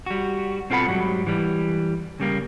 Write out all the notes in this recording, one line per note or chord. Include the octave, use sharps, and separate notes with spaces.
G3 F#4
B2 C4 F4 A4 F#5 B5
G#2 F#3 G3
E3 G3
C#3 G3 A#3